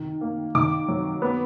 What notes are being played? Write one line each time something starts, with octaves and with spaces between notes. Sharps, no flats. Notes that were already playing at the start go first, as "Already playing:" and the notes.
Already playing: D#3
A#3
D#3 D6
F#3
B3